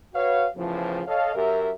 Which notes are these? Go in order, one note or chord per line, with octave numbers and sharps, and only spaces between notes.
F#4 B4 C#5 F5
E2 A2 C#3 E3 F3
A4 C#5 D#5 F5
F#2 G4 A#4 E5